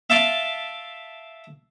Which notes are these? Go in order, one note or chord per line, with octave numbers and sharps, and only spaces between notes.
E5 F5 A5 C6 D6